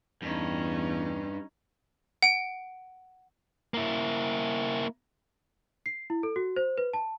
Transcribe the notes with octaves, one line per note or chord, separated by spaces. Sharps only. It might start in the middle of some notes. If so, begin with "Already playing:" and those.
E2 G2 C#4 D#4
F#5 D7
A#3 E4
C7
E4
A4
F#4
C5
B4
A5